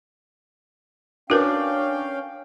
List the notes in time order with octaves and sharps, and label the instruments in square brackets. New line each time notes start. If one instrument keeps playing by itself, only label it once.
[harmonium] C#4 F5 G5 [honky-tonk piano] D4 [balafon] F#4 A#4 B4